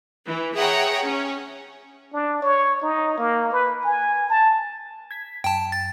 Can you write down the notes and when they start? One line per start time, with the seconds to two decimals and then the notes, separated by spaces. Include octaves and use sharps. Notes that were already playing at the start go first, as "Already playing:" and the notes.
0.24 E3
0.54 G#4 C#5 E5 F#5 G5 A#5
1.04 C#4
2.13 D4
2.42 C#5
2.82 D#4
3.18 A#3
3.52 B4
3.84 G#5
4.29 A5
5.11 G#6 B6
5.44 F#2 G5 A5
5.72 A6